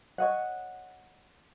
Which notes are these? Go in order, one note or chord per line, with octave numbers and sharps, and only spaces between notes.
C#5 D#5 F#5